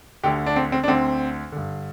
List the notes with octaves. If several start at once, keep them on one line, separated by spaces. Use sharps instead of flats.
D2 D3 G4
D4
C4
C4
D4
D2 D3 C4
G2 D3